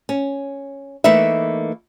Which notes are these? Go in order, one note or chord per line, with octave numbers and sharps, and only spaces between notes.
C#4
E3 A3 A#3 D#4 B4 E5